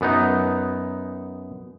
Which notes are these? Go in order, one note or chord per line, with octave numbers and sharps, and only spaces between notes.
F#2 B3 D#4